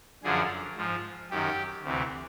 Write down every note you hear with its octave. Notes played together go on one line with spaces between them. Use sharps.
F#2 D3 F3 G#4
G#2 F3
F#2 D#3 G4
D2 C3 E3